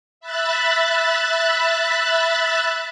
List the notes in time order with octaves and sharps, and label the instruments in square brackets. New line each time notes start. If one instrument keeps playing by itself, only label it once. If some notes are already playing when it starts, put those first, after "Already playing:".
[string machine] E5 B5 F#6 A6